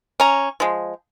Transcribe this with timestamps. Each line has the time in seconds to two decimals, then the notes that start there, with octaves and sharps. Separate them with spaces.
0.20 C#4 A#5
0.60 F3 G#3